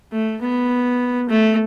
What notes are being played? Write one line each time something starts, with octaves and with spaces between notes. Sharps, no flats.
A3
B3
A3